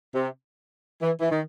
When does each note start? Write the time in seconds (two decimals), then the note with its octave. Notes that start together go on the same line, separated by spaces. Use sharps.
0.14 C3
1.02 E3
1.21 E3
1.31 D#3